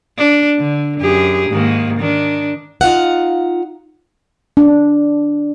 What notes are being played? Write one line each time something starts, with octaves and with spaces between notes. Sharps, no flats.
D4
D3
F#2 G4 G#4
G#2 D#3 A#3
D#3 D4
D#4 F4 F5 F#5
D4